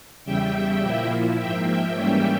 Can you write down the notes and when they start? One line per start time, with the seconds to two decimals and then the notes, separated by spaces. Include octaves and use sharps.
0.24 E2 C#3 G3 E5 G5
0.81 A#2 F3 A#3 E4
1.37 G#2 F3 A#3 E5 G5
1.65 E5 G5
1.94 G#2 E3 G3 A#3 C#4